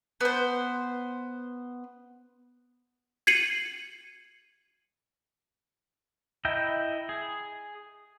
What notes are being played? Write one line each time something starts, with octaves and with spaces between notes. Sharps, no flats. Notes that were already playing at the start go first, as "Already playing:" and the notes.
B3 C5
G#6 C7 C#7 D#7 F#7
E4 D#5 E5 G5 A#5
G#4